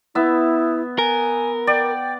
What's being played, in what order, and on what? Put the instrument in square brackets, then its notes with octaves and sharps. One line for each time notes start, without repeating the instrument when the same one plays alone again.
[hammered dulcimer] B3 E5 [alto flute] E4
[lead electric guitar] A#4 [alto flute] G#5
[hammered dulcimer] D5 [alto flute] G5